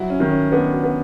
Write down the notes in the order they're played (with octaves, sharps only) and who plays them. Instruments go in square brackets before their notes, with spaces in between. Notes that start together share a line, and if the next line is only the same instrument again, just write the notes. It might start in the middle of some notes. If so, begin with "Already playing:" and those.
Already playing: [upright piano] F#3 [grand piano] E4
[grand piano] C#4
[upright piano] D#3
[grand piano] C#4
[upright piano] B3 [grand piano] D4
[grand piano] F#4
[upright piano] B3